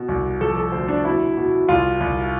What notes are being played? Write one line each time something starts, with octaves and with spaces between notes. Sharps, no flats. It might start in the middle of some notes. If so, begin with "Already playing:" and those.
Already playing: B2
C2
F3 A4
A4
D2 C5
D4
B2 E4
B2
C2 F4
C2